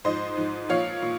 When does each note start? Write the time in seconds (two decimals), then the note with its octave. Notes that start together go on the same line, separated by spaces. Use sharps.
0.04 G#2 F3 C5 D#5
0.37 G#2 F3
0.69 A#2 F3 C#5 F5
1.02 A#2